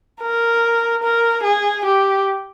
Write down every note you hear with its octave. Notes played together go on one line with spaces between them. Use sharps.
A#4
A#4
G#4
G4